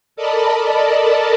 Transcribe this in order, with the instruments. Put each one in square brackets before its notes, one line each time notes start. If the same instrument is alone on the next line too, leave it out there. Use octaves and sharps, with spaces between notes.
[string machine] A4 A#4 D5 D#5 A5 B5